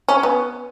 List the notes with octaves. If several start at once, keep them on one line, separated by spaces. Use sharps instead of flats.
C#4
B3